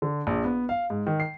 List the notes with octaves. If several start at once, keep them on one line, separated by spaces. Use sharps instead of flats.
D3
A#1
B3
F5
G#2
D#3
C7